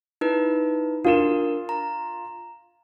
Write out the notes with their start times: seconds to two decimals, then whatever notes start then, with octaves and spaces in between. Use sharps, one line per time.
0.21 D#4 E4 B4
1.05 D4 F4 A#4 E7
1.69 A#5